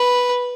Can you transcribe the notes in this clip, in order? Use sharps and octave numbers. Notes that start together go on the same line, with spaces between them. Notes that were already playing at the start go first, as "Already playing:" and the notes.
Already playing: B4